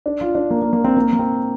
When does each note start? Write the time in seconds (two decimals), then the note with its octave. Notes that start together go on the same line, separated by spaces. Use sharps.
0.06 D4
0.21 F4
0.35 D4
0.50 A#3
0.62 A#3
0.73 A#3
0.84 C4
0.97 A#3
1.13 A#3
1.19 C4